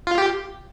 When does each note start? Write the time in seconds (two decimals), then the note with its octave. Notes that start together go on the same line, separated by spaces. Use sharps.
0.07 F4
0.18 G4